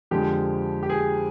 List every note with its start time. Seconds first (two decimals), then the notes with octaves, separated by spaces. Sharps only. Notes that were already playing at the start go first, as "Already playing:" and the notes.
0.11 F2 D3 F3 G#3 G4
0.83 G4
0.90 G#4